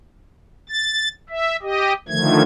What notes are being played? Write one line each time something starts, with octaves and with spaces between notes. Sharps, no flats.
A6
E5
G4 D#5
D3 D#3 F3 A3 G#6